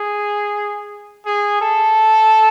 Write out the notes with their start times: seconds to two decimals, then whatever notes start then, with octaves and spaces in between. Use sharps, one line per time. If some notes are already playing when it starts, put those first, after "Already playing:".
Already playing: G#4
1.26 G#4
1.61 A4